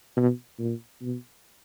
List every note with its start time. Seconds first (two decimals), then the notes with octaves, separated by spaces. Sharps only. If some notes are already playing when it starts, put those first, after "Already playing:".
0.17 B2
0.59 A#2
1.02 B2